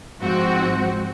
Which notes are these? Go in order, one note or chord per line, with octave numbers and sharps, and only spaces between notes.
G#2 F3 C4 F#4